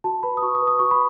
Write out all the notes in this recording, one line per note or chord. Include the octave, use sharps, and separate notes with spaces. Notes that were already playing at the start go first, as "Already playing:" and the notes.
F#4 A5
B4 B5
D#6
F#4 C#6
D#6
B4
D#6
F#4 C#6
B5